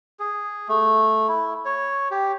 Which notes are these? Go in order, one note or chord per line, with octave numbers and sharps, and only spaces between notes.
G#4
A3
E4
C#5
G4